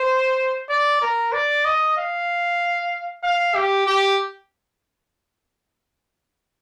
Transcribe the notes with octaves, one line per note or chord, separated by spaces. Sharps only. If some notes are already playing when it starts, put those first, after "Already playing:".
Already playing: C5
D5
A#4
D5
D#5
F5
F5
G4
G4